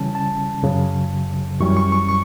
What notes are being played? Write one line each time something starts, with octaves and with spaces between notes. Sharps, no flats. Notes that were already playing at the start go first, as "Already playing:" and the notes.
Already playing: C#3 E3 G3 C#4 A5
A5
F#2 C#3 F#3
F#2 E3 G3 C#4 C#6
C#6
C#6
C#6